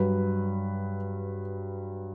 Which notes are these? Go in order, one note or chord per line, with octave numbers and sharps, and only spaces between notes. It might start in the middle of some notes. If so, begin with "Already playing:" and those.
Already playing: G2 F#3 B4